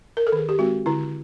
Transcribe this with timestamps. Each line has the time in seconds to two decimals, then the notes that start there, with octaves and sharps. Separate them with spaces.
0.17 A#4
0.27 A4
0.32 D#3 G#4
0.49 G4
0.59 G#3 C4 F#4
0.86 D3 E4